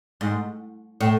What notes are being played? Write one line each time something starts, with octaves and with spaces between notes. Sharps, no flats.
G#2
A2